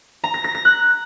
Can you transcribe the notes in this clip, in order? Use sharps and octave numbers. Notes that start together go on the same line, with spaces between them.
A#5
A#6
A#6
A#6
F#6